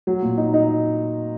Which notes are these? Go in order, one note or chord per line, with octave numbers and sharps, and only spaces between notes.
F#3
A#2
D#4
D#4